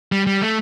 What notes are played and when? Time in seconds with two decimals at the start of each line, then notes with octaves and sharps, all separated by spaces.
0.12 G3
0.27 G3
0.42 A3